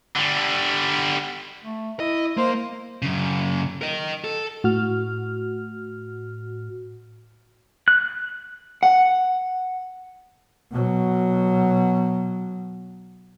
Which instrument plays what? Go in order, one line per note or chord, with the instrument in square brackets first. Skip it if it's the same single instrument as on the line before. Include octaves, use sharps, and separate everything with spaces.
[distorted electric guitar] D3 G3
[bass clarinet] A3
[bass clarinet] E4 [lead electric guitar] D#5
[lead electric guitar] A#3 [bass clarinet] C5
[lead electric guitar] F#2 C#3
A#4 D#5
A4
[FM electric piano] A2 F#4 F6
[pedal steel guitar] F#6
[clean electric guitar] F#5
[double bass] B2 F#3